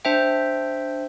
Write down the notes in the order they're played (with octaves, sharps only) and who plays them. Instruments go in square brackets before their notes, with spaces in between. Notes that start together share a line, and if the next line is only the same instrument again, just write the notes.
[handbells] D4 C5 E5 G5